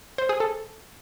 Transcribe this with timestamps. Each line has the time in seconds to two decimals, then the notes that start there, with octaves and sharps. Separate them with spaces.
0.18 C5
0.29 G#4
0.40 A4